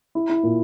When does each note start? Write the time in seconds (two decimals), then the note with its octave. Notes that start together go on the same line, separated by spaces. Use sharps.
0.15 E4
0.29 E4
0.43 A#2